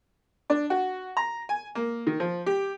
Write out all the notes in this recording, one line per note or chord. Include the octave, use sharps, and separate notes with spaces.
D4
F#4
A#5
G#5
A#3
D#3
F3
G4